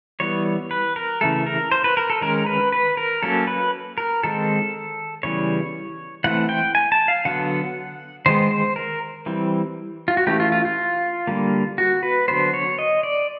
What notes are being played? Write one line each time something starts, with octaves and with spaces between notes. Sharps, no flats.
E3 G3 B3 C#5
B4
A#4
C#3 E3 A3 A4
A#4
C5
B4
A#4
A4
D#3 G#3 C#4 A#4
B4
B4
A#4
F#3 A#3 C#4 A4
B4
A#4
D#3 G#3 C4 A4
C#3 E3 G3 B3 C#5
E3 A3 C4 F#5
G5
G#5
A5
F5
D3 F#3 B3 F#5
D#3 G#3 B3 C5
C5
A#4
E3 G3 C4
F4
F#4
E3 A3 C#4 G4
F4
F4
F4
D3 G3 A#3
F#4
B4
D3 F#3 B3 C5
C#5
D#5
D5